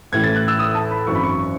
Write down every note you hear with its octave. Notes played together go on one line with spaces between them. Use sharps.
A1 A2 E3 G#6
A6
F#6
E6
D#6
A5
B5
G#1 F#2 E3 C#6
B5
C#6